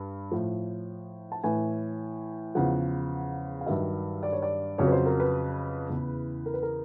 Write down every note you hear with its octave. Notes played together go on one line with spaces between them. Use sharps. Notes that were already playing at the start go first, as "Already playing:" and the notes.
Already playing: G2
A2 F3
A5
A2 E3 G#5
E2 C#3 F3 F#5
F5
G2 D#3 F#3 E5
D5
C#5
D5
F2 C#3 F#3 C#5
B4
C5
A#4
B4
E2 C#3 E3
A#4
B4
A#4